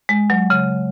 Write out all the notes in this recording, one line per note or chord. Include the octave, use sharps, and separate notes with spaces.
G#3
F#3
C#3